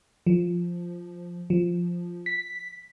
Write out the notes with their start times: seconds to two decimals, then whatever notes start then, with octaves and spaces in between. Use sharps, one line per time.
0.27 F3
1.50 F3
2.26 B6